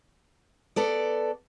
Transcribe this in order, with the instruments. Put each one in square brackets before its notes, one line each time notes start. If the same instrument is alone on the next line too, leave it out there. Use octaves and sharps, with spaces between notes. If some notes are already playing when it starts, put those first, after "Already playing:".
[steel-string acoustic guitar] B3 A4 D5